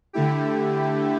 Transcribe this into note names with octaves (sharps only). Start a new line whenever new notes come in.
D3 A3 E4 G4